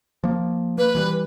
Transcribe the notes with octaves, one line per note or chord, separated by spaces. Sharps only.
F3 A#3
A#3 B4
E3 F3 G3